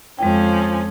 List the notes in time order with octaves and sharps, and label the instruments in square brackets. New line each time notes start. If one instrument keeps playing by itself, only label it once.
[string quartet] F2 F3 C#4 [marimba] G#3 G5